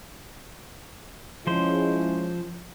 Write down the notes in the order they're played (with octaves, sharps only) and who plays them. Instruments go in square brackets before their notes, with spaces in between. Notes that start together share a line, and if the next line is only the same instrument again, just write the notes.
[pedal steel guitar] F3 C5 [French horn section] G#3 C#4 E4